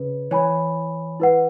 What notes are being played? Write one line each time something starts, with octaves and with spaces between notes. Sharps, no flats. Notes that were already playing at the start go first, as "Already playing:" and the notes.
Already playing: C#3 B4
E3 C#5 G#5 B5
E4 B4 F#5